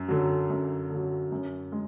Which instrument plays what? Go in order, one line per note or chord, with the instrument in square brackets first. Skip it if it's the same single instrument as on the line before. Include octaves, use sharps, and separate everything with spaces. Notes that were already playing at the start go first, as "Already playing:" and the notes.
Already playing: [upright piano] F#2
D3 F#3
F#2
D3
F#3
F#2
G#3